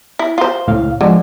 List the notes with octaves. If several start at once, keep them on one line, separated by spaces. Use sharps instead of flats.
E4
F4 C5
C#2 A2 F5
D3 F3 G#3